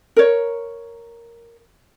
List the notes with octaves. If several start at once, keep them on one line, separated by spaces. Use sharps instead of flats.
A#4 C#5